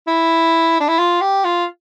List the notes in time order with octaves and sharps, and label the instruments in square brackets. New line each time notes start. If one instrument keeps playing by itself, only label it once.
[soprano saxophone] E4
D4
E4
F4
G4
F4